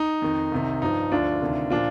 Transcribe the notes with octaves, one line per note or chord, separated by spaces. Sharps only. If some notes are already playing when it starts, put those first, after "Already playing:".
Already playing: D#4
F2 D#3
C2 C3 D#3
G2 F3 D#4
D2 D3 F3 D4 F4
D2 C3 D#3
A#2 F3 D4 F4